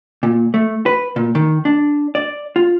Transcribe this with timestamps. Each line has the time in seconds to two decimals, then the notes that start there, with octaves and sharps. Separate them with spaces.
0.23 A#2
0.54 A3
0.86 B4
1.16 A#2
1.35 D#3
1.65 D4
2.15 D5
2.56 F4